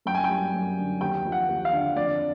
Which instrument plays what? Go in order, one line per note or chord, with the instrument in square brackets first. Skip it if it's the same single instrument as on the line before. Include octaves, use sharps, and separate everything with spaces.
[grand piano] F#2 G5
G#5
G5
G3
F#2
D3
D#2 G5
F3
F#5
D#2
F5
D3
F2 D5